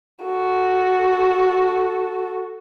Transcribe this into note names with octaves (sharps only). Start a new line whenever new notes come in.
F#4 A4